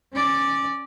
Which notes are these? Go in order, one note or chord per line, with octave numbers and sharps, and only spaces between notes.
C#4 D5